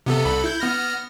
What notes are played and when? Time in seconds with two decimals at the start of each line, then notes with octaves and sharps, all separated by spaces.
0.06 C3 B3 A4
0.25 C2 A4 B5
0.44 E4 G6
0.60 B3 F6 A#6